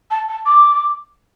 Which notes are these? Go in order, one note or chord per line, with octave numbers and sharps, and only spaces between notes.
A5
A5
D6